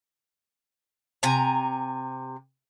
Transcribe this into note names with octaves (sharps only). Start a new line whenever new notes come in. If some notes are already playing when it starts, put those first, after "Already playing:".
C3 G#5 A#5